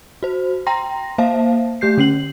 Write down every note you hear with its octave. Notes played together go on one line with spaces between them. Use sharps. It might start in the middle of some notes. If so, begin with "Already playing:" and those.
F#4 C5
G5 A#5 C6 A#6
A#3 C5 E5 F5 A5
A3 G4 G6 C7
D3 C#4 C7 F#7